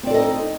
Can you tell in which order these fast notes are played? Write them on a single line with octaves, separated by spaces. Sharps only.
C4 D5 A4 D#5 D#4